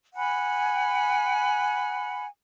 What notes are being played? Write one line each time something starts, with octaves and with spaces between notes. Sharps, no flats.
F#5 G#5 B5